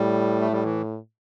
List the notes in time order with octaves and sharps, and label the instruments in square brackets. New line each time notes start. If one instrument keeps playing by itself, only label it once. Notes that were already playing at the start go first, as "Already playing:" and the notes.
Already playing: [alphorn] A2 [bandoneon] G3
[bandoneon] A3
G3
E3